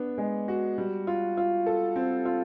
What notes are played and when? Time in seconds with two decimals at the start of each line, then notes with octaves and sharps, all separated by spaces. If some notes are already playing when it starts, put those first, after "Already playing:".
Already playing: B3 D4
0.18 G#3
0.48 F#4
0.78 G3
1.07 F4
1.37 F4
1.66 A4
1.96 C4
2.25 F4